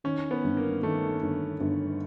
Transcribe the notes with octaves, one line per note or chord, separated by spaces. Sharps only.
D#3 C#4
B3
G1
A#3
D#3 A3
G1
G1